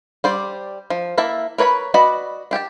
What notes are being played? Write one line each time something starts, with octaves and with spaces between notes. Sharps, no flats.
G3 C5 D5
F3
A#3 E4 E5 A5
A#4 B4 C#5 A5 B5
F#4 B4 D5 D#5 B5
D4 G4 G5 A5